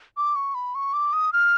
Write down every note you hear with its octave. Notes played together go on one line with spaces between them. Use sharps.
D6
C#6
B5
C#6
D6
D#6
F6